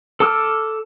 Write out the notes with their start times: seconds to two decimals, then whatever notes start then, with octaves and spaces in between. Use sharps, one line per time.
0.20 A4 A5 D6 E6 F6